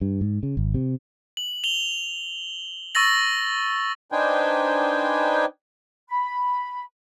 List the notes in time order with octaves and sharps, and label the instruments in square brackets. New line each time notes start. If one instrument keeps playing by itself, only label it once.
[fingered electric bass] G2
G#2
C#3
G#1
C3
[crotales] F#7
F7 G7
C#6 E6 A6 A#6 F#7
[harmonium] D4 D#4 B4 C5 G5 G#5
[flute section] B5